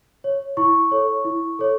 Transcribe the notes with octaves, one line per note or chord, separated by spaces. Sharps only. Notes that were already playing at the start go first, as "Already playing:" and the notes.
C#5
E4 C#6
A4 C#5
E4
A4 C#5